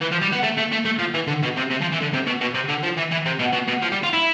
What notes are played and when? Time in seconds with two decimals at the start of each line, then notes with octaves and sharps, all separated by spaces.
0.01 E3
0.11 F3
0.22 G3
0.32 B3
0.42 A3
0.57 A3
0.72 A3
0.85 A3
0.99 F3
1.14 E3
1.27 D3
1.42 B2
1.56 C3
1.70 C3
1.81 F3
1.92 E3
2.01 D3
2.13 C3
2.26 B2
2.41 B2
2.54 C3
2.68 D3
2.83 F3
2.97 E3
3.11 E3
3.25 C3
3.39 B2
3.53 B2
3.68 B2
3.82 F3
3.92 G3
4.03 F4
4.13 E4